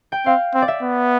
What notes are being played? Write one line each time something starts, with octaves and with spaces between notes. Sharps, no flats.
G5
C4 F5
C4
D5
E5
B3